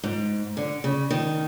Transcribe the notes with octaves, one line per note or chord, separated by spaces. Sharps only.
G#2
D3
C#3
D#3